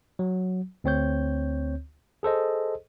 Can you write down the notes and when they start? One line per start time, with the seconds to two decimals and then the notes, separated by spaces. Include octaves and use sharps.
0.19 F#3
0.84 D2 C4 C#5 G6
2.23 G#4 A4 C5 D#5